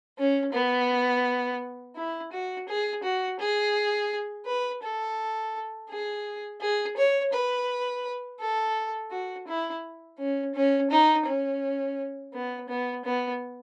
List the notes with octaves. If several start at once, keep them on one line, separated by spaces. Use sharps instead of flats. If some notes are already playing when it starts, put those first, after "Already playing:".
C#4
B3
E4
F#4
G#4
F#4
G#4
B4
A4
G#4
G#4
C#5
B4
A4
F#4
E4
C#4
C#4
D#4
C#4
B3
B3
B3